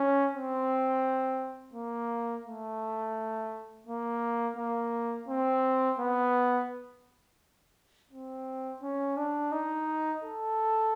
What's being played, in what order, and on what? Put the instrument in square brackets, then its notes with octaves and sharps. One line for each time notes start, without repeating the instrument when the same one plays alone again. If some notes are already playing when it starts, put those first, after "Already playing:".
Already playing: [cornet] C#4
C4
A#3
A3
A#3
A#3
C4
B3
C4
C#4
D4
D#4
A4